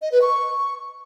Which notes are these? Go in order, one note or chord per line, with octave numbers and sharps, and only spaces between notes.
D#5
B4
C#6